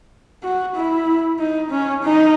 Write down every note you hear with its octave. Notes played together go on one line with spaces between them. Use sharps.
F#4
E4
D#4
C#4
D#4